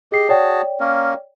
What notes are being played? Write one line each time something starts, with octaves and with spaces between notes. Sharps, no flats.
G4 G#4 D#5 C7
F#4 G#4 C#5 D5 G5 A5
A#3 C#4 A#4